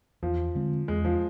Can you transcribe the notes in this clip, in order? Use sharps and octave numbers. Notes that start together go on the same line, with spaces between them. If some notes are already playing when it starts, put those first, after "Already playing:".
E2 F3
D3 G#3 C4
E2 G#3
F3